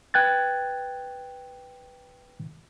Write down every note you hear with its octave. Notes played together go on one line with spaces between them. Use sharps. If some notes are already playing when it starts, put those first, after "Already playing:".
B4 G5 F#6 G#6 A6